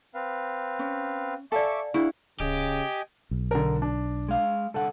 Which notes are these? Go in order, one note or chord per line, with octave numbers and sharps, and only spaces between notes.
C4 B4 F5
C#4
A4 D5 E5 F5 G#5 C#6 D6
D4 E4 G#4 F5 F#5 C#6
D1 C#3 G4 D#5 G5 G#5
B1
D3 A#4
D4
G#3 F5
C2 D3 A4 F#5